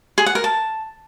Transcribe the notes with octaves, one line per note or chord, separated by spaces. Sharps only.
G#4
F#5
A#4
A5